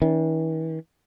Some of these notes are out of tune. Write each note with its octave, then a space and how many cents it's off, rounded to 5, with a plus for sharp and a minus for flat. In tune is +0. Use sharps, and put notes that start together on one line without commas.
E3 -45 C#4 +35